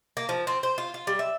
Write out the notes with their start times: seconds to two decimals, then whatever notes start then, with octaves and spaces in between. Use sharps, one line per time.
0.17 A#3
0.29 F3
0.47 C4
0.63 C5
0.78 F4
0.94 F4
1.07 G3
1.19 E5